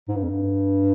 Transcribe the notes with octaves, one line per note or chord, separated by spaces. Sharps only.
G#2
G2
F2
G2